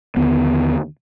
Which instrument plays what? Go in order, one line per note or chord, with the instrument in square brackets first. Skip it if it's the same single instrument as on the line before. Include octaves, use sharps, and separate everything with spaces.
[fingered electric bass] D#2 D3 B3